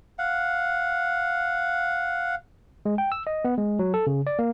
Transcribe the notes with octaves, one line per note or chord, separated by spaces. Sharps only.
F5 F#5
G#3
G5
E6
D#5
B3
G#3
F#3
A4
C#3
D5
A#3